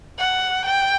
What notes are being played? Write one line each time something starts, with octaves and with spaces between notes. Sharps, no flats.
F#5
G5